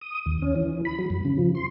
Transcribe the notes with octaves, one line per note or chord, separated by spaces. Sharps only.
D#6
D#2
C#4
E3
B5
F#3
F#2
C#3
F3
C6